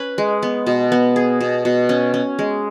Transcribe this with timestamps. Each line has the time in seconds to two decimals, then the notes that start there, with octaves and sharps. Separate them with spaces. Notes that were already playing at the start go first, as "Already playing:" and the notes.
Already playing: C#4 B4
0.18 G#3
0.43 B3
0.67 B2
0.92 B3
1.16 G#4
1.40 B2
1.65 B2
1.89 C#4
2.14 C#4
2.39 G#3